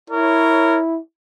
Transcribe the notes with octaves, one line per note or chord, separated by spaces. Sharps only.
E4 A#4 C#5